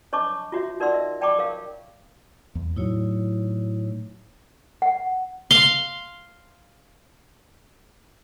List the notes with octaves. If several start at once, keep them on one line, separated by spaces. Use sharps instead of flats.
D4 C#5 D#5 A5 C#6 D6
F4 F#4 C#5 E5
D#4 A#4 D5 F#5 C6 E6
D#5 E5
D5 G5 A5 B5 C#6 D6
A#4 C#5 F5
E2
A2 F#3 D#4 E4 C#5
F#5
F5 C6